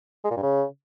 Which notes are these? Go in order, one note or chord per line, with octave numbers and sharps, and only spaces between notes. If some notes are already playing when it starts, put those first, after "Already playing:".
G#3
A#2
G2
C#3